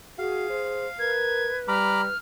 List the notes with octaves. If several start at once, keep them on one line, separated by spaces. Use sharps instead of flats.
F#4 G#4 F5
C5
A#4 B4 G#6
G3 A#5 B5 D6 F6